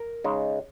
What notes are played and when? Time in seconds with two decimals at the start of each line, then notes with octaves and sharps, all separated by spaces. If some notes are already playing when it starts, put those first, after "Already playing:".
Already playing: A#4
0.24 C#3 G#3 D#4